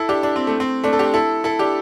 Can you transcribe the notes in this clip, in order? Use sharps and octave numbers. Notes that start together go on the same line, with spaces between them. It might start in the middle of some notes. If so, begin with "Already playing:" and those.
Already playing: E4 A4
D4 G4
D4
C4
A3
C4
A3 D4
A4
D4 G4
E4 A4
E4 A4
D4 G4